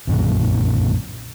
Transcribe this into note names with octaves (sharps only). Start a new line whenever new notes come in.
B1 F#2 A#2 D#3